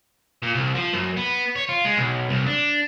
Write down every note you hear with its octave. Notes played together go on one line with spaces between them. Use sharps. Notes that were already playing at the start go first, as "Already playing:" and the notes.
A#2
C2
F3
F#2
B3
C#5
F4
G#3
B1
C2
D4